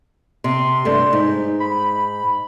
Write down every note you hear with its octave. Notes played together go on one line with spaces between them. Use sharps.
C3 C6
G2 A3
G#2 D#4
B5